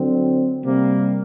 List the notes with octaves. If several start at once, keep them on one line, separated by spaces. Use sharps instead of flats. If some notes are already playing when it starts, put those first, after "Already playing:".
Already playing: D3 F#3 C4
C3 G3 A#3